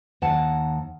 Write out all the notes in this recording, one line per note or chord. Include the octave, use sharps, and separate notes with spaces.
D#2 D#3 F#5 A5